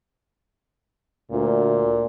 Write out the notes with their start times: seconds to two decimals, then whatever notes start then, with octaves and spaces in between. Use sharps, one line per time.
1.32 D2 A#2